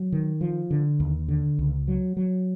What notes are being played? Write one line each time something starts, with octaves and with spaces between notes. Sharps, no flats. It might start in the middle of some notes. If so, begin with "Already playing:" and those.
Already playing: F#3
D#3
F3
D3
D#2
D3
C#2
F#3
F#3